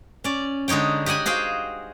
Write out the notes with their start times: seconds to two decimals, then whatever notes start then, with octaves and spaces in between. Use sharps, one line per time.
0.24 C#4 D5
0.68 D3 G#3 D#4 C#5 G5
1.06 G4 D#5 F#5 G#5 B5
1.26 F#4 G#4 C5 F5 G5